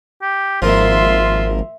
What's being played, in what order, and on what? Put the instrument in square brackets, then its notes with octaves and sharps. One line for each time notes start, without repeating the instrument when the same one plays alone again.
[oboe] G4
[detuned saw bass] G#1 [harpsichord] F3 A#3 [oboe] F4 [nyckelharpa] E5 C6